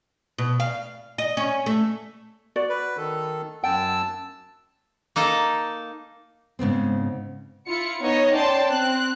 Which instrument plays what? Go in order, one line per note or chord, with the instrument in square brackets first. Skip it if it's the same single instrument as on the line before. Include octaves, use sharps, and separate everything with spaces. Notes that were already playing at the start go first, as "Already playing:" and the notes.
[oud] B2
F5
D#5
C#4
A3
[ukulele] F#4 D5
[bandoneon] B4
D#3 A4
[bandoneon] F#2 A5 E6 [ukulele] G5
[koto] A#3 D#4 A4
[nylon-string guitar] G#2 C#3 B3 C4
[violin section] E4 F4 C#7
B3 D#4 C#5 D#5
C#4 D5 G5 A5 C6
C4 F#6